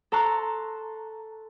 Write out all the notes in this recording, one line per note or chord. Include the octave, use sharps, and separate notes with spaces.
A4 A5 A#5 C6 C#6 F#6